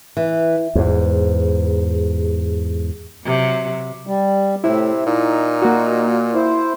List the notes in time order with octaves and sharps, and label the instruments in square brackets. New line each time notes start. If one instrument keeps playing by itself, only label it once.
[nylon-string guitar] E3
[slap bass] E2 G#2
[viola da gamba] C3 F#3
[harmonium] G3
[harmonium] A2 [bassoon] C3 [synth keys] E4
[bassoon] A#2 [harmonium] D#4
[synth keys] A#3 F#4
[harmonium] E4 C5